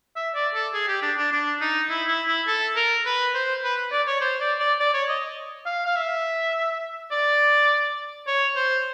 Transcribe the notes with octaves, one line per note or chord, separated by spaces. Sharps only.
E5
D5
A4
G#4
G4
D4
D4
D4
D#4
E4
E4
E4
A4
A#4
B4
C5
B4
D5
C#5
C5
D5
D5
D5
C#5
D#5
F5
F5
E5
D5
C#5
C5